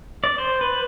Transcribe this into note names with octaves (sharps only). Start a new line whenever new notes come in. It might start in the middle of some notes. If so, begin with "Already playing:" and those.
D5
C5
B4